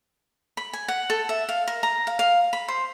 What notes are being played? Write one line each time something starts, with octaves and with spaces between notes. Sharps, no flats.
B5
G#5
F#5
A4
E5
F5
A#4
A#5
F5
F5
B5
C5